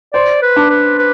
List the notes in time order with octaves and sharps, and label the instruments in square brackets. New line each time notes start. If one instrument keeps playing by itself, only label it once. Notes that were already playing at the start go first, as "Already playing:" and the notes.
[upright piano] C5 [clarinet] D5
[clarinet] B4
[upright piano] D4
[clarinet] B4
B4